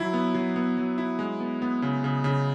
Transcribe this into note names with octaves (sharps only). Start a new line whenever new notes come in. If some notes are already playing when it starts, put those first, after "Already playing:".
Already playing: F#3 E4
B3
F#3
B3
F#3
E4
G#3
B3
B3
C#3
C#3
C#3